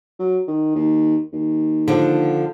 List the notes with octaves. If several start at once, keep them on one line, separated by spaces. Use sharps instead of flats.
F#3
D#3
D#2
D#2
D3 F3